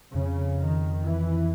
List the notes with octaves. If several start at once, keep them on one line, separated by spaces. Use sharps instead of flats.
F2 C#3
D#3
E3